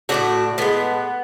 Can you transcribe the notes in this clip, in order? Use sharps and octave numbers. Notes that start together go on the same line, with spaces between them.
A2 E3 A3 D4 F#4
A2 G#3 B3